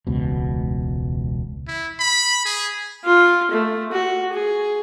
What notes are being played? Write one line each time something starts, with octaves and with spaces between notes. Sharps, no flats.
E1 C#2 B2
E4
B5
G#4
F4
A3
F#4
G#4